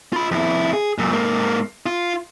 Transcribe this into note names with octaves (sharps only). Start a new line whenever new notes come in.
F4 B5
F2 E4
G#4
F#2 A#2
G#2 A#3
F4